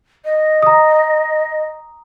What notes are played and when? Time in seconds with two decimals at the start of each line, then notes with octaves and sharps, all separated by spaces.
0.25 D#5
0.62 A#5 D#6